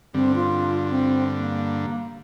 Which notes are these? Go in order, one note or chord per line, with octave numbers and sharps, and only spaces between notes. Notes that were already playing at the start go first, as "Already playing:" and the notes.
G2 D3 C4
F4
C4
A#3